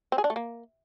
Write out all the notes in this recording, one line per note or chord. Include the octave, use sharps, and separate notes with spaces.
C4
G#4
D4
A3
A#3